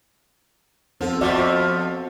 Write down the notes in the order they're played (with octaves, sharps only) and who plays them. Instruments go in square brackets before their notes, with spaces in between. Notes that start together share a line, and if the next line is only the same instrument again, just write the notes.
[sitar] F3 [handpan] B3 C4 A4
[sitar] F2 F3 [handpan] F#4 D5 E5